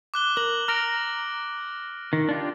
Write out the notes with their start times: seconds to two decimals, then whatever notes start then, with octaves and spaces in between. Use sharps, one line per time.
0.14 D6 F#6 G7
0.37 A#4 F#7
0.68 A#5 F6 A#6 D7
2.13 D#3
2.29 D4 F4 G4